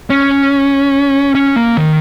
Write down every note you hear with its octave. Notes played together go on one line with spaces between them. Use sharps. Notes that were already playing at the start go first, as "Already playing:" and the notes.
C#4
C#4
A#3
D#3